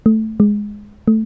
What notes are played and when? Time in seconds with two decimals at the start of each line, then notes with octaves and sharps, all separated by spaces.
0.06 A3
0.40 G#3
1.08 A3